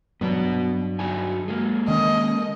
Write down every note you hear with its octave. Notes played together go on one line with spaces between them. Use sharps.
G2 F#3 B3 F#4 F#5
D#4 F#4 G#5
G#3 A#3
D#3 C#4 D#5